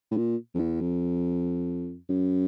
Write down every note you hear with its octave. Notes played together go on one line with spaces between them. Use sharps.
A2
A#2
F2
E2
F2
F#2